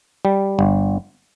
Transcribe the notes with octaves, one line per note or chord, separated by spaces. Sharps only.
G3
G1